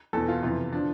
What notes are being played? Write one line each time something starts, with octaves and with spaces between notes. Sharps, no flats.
E2 B2 A4
F4
F2 C3 E3 F4
D3 F3 D4